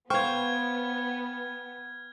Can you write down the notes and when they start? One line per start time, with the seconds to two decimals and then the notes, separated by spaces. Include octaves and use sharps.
0.10 B3 C5 F5 G5 C#6 F6 G#6